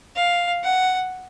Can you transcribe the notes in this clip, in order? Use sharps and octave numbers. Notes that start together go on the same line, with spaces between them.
F5
F#5